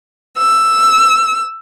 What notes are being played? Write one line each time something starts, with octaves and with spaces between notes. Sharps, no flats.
E6